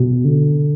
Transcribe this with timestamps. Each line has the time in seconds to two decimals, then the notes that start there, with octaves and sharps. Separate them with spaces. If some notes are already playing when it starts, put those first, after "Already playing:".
Already playing: B2
0.25 D3